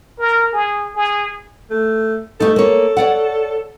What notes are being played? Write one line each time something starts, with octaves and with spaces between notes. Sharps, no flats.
A#4
G#4
G#4
A3
A3 D#4 A4
A#3 C#5
C#5 D5 F#5